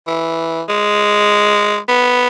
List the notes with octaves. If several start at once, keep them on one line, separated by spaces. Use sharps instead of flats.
E3
G#3
B3